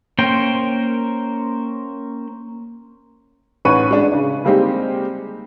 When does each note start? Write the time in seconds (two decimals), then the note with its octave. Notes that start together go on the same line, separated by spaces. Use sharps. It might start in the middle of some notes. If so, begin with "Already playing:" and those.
0.18 A#3 C#4 A#4 C5 G5
3.65 A1 D#4 B4 C#5 C#6 D#7
3.91 G#3 D4
4.12 C#3 D4
4.44 G3 G#3 A#3 C4 D#4 G4